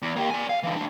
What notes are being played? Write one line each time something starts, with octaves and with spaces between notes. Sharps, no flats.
E2
A#3 G4
D5 G#5
F5
D3 E3
A3 D4